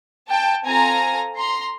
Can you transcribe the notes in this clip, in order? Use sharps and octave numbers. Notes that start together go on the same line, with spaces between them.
G5 A5
C4 F4 A4 G#5 A#5
A#5 C6